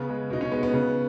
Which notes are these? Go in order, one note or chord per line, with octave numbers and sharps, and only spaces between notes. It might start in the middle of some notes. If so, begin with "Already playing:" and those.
Already playing: C#3 B3
G#3
B2 D#4
C#4
G#3 B3
B3
C#3